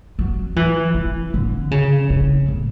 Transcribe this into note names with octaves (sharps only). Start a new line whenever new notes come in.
F#3
E3
E3
D3
C#3
C#3
A2